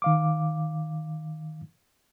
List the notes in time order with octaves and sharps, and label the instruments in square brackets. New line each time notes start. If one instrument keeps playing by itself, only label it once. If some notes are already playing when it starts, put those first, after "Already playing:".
[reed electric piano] D#3 F5 D6